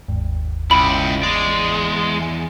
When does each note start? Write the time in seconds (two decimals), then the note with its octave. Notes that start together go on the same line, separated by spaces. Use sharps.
0.08 G1 D#2 G#2
0.71 C#2 E4 G5 B5
1.23 E2 G#3 D5
2.22 G#5